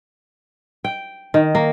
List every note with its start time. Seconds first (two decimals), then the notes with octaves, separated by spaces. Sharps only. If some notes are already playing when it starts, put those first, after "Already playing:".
0.85 G5
1.34 D#3
1.55 A#3